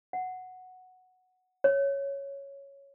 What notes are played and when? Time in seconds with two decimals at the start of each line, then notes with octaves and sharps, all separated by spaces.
0.13 F#5
1.64 C#5